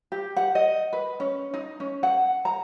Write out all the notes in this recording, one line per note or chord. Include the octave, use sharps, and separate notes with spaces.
G4
F#5
D#5
B4
C#4
D#4
C#4
F#5
A#5